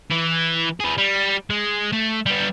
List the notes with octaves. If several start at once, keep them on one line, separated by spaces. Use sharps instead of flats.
E3
G#4 B4
G3
G#3
A3
G3 B3